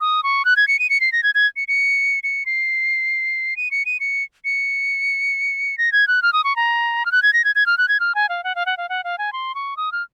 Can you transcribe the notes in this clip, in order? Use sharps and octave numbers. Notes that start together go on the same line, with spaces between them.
D#6
C#6
F#6
G#6
C#7
D#7
C#7
C7
A#6
G#6
G#6
C#7
C#7
C#7
C7
D#7
C#7
D#7
C#7
C#7
A#6
G#6
F#6
F6
D#6
C#6
A#5
F6
F#6
G#6
A#6
G#6
G#6
F6
F#6
G#6
F6
G#5
F5
F#5
F5
F#5
F5
F#5
F5
G#5
C6
C#6
D#6
F6